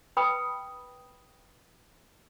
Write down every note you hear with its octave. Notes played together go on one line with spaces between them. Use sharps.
B4 G5 B5 D#6